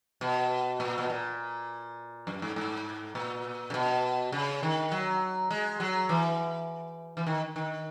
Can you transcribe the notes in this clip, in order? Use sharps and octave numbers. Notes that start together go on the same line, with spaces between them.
B2
A#2
B2
A#2
F#2
G#2
G#2
A#2
C#3
B2
C#3
D#3
F#3
G#3
F#3
E3
E3
D#3
D#3